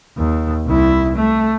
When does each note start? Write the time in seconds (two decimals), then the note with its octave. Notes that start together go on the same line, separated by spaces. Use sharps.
0.18 D#2
0.65 C2 E4
1.16 A3